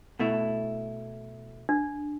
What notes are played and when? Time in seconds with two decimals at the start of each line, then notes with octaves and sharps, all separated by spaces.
0.19 B2 A3 E4
1.69 D4